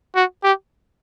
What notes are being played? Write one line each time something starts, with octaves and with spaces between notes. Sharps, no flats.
F#4
G4